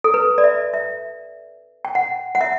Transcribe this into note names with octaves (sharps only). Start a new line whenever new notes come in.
A4
B4
D5
E5
E5
G5
F#5
F#5
E5